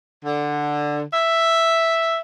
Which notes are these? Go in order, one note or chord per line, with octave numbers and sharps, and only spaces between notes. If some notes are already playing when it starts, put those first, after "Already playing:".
D3
E5